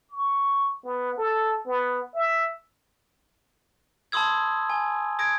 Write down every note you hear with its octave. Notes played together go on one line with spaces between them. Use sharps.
C#6
B3
A4
B3
E5
A5 B5 C6 D#6 E6 G#6
G#5
D#6 G#6 A#6 D7